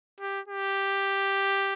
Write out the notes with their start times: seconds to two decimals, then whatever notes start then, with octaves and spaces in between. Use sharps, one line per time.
0.20 G4
0.48 G4